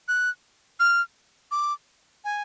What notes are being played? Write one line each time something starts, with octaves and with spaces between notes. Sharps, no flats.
F#6
F6
D6
G#5